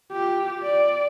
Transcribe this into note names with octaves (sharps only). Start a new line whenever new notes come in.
F4 G4
D5